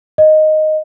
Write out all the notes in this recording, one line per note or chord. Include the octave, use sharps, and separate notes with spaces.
D#5